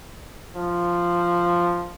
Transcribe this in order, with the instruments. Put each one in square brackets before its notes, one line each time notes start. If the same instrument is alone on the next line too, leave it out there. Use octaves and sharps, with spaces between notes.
[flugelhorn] F3